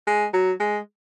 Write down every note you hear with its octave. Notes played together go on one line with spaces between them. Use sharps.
G#3
F#3
G#3